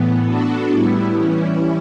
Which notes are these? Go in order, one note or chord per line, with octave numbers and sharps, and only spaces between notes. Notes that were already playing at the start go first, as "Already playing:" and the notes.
Already playing: A2 E3 B3
B3 D4 F#4 A4
A2 G3 B3 E4
E3 G3 C#4 E4